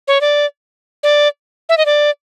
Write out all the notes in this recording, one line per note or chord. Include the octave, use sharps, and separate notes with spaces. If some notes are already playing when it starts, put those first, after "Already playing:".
C#5
D5
D5
E5
D#5
D5